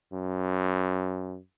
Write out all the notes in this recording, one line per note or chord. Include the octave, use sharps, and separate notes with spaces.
F#2